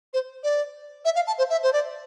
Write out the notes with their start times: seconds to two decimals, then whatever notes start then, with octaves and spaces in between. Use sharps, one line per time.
0.13 C5
0.43 D5
1.04 E5
1.15 F5
1.27 A5
1.38 C5
1.49 E5
1.62 C5
1.72 D5